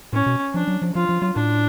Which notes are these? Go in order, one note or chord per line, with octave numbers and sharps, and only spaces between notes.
A2 C#4
B2
F3 D4
F#3
F3
F3 F4
F3
F#3
A2 D4